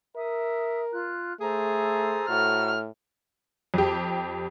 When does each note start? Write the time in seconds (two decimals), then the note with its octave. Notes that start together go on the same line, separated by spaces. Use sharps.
0.16 A#4 E5 D#6
0.91 F4 F#6
1.40 A3 G#4 A4 C5 A#5
2.29 A2 F#4 F6
3.74 F2 G4